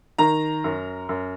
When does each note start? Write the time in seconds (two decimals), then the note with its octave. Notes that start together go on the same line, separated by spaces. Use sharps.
0.18 D#3 A#5
0.64 F#2
1.09 F#2